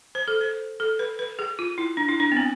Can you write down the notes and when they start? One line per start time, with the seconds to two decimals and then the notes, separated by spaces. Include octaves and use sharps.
0.15 C5
0.28 A4
0.41 C5
0.80 A4
0.99 B4
1.19 B4
1.39 G#4
1.59 F4
1.78 E4
1.97 D4
2.08 E4
2.20 D4
2.32 B3
2.37 C4